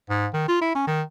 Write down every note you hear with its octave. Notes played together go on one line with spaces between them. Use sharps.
G#2
D#3
F4
E4
C#4
D#3